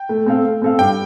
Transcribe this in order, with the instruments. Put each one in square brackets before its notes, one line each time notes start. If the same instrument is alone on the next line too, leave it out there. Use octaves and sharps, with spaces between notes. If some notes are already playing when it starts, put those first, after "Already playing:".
Already playing: [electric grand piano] G5
[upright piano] A3
C4 A4 F5
A3
C4 A4 F5
[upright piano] G2 [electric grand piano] G5